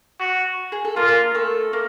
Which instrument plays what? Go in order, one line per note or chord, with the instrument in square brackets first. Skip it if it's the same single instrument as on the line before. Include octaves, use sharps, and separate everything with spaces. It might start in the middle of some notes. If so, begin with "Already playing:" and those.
[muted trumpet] F#4
[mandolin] G#4
A4
[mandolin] A#3 A#4 [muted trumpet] F4
[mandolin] A3 A4
A#3